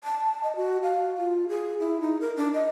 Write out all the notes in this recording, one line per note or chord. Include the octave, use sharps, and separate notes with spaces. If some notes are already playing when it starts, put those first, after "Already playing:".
A5
D#5
F#4
F5
F4
G#4
E4
D#4
A#4
D4
D#5